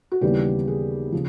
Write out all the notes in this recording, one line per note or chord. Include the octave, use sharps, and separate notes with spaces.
F#4
D#2 C#3 E3 G3 B3 G4
G#4
C#3 F3